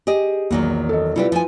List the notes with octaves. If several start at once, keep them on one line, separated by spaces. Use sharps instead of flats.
G4 G#4 D#5
A#1 E2 D#3 F#3
A4 D#5
C3 G3 E4 F4 G4 B4
F3 G#5